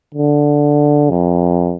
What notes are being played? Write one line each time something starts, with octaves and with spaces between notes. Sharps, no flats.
D3
F2